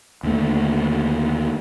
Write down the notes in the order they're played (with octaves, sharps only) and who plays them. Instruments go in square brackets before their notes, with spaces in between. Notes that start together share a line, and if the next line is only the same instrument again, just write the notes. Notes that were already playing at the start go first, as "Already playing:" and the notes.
[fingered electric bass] D#2 D3 F#3 A3